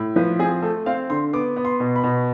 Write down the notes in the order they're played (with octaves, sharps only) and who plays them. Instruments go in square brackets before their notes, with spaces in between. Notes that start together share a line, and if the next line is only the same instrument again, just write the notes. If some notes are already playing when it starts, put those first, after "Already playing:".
Already playing: [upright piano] A2
F3 B4
C4 G#4
A3 A4
C4 F5
D3 C6
B3 D6
B3
C6
B2
B5
B2